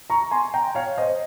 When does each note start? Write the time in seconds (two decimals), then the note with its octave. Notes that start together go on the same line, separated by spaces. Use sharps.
0.10 A#5 C#6
0.31 G#5 C6
0.54 G5 A#5
0.75 C#5 F5
0.98 C5 D#5